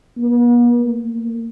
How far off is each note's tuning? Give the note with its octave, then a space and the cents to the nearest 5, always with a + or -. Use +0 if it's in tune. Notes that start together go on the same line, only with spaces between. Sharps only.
B3 -45
A#3 -30